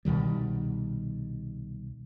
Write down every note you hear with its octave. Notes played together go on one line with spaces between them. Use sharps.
C2 B2 D#3 G3